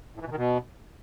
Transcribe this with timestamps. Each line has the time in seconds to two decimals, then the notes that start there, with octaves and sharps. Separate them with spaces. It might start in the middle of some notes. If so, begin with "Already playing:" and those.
0.16 A2
0.21 E3
0.26 B2
0.31 D#3
0.36 B2